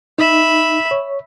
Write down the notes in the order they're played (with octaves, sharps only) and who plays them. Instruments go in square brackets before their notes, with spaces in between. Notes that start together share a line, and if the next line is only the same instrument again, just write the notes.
[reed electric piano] D#4 [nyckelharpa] E5 B5
[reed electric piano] C#5